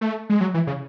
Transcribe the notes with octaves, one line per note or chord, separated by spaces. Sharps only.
A3
G#3
F#3
E3
C#3